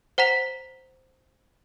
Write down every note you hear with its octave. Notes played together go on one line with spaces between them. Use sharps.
C5 F#5 A#5 B6 F7